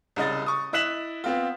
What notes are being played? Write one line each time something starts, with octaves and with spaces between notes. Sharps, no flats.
C2 C#3 D#5 A6
C#6 D#6
E4 D#5 F#6 B6 E7 F#7
B3 C4 F4